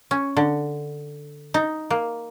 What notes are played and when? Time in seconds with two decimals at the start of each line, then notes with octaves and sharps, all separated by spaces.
0.11 C#4
0.37 D3
1.54 D#4
1.90 A#3